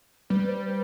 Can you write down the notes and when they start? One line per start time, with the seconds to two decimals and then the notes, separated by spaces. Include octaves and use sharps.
0.30 G3 B4
0.48 C5
0.66 B4